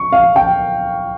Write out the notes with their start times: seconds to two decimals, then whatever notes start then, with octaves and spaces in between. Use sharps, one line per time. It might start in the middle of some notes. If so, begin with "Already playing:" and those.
Already playing: C#6
0.12 F5
0.36 G5